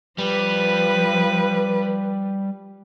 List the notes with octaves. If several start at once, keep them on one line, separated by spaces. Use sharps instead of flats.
F3 G3 B4